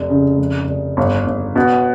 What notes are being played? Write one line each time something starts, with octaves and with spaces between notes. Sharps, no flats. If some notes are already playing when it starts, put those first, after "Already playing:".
Already playing: F1
C#3
F1
F1
G1
G1
B2